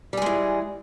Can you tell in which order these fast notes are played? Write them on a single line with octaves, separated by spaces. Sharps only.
G3 G#4 G#3 E3